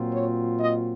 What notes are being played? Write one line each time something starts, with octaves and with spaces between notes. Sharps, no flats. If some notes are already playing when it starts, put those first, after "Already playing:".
Already playing: A#2 F#3 C4 F4
C#5
D#5